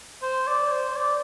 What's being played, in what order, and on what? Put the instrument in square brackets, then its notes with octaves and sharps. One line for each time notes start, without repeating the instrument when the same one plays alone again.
[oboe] C5
D5
C5
D5